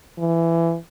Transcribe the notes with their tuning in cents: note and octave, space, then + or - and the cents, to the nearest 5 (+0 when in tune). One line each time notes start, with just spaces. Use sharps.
E3 +20